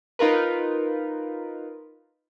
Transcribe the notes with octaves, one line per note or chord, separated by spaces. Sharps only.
D#4 F4 A#4 B4